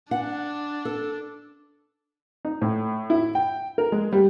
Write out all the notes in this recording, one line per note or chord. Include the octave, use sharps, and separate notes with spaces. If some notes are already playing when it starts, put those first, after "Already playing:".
D4 F#5
A4
D#4
A2
E4
G5
A#4
G#3
G3